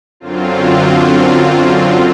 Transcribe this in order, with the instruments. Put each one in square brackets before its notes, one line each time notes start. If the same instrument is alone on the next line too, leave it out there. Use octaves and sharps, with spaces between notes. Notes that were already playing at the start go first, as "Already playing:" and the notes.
[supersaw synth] F#2 D3 F#3 C4 F4